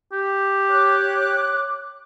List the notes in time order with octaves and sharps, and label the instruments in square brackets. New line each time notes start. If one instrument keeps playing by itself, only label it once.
[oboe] G4
[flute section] C#5 D6 F#6